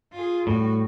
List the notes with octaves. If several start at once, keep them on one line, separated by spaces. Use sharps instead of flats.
F4 G#4
A2 G3 F#4